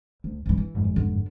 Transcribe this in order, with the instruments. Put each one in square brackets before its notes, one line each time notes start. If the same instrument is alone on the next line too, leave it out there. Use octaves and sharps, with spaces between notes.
[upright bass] D2
E2 E3
E3
[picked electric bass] G1 F2 G#2
[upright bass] D3 D4